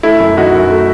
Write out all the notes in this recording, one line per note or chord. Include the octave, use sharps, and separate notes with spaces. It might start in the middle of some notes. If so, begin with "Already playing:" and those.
A3 E4
F#2
D#3 D#4 F#4
F#2
A3